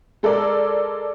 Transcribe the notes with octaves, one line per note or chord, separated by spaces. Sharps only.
G#3 A4 A#4 D5